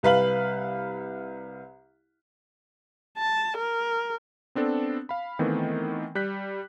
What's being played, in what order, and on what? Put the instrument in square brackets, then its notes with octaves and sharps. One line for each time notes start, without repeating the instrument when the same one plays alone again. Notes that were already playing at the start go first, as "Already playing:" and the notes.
[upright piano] C2 B4 F5 F#7
[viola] A5
A#4
[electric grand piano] B3 C4 D4 A4
F5 B5
D#3 E3 A3 B3 C4
G3 F#6 G6 B6